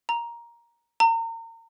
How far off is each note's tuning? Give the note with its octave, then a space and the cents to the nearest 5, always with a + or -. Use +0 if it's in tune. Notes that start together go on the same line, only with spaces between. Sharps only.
A#5 +10
A#5 -35